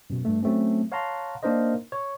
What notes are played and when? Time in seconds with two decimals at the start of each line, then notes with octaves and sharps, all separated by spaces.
0.10 F#2 B2
0.25 G2 A3
0.43 F#3 A3 C4 C#4
0.92 C#5 F5 F#5 A5 A#5 C6
1.43 A#3 D4 D#4 A#4 C5 D#5
1.92 C#5